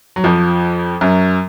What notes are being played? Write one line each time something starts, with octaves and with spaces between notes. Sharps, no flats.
F#3
F2 F3
F#2 F#3